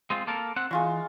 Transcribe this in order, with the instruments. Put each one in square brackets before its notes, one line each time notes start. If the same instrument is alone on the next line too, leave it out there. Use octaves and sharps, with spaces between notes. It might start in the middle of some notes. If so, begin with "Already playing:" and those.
[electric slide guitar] G#3 C4 F4
A#3 A4 A#4
C4 F#5
[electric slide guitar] E3 [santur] G#3 F4 C#6